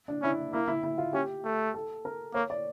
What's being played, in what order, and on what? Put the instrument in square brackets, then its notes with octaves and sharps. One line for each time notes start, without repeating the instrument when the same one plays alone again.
[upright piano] D4
[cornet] C#4 [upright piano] E4
[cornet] A#3 [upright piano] E4
[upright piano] E4
E4
F4
[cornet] C#4 [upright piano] G4
[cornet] A3
[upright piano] A4
A#4
[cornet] A#3 [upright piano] C#5
[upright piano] D5